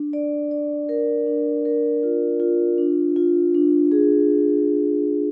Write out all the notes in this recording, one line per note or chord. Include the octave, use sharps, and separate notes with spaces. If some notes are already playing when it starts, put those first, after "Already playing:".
Already playing: D4
D5
D5
A#4
D4
A#4
F4
F4
D4
F4
D4
G#4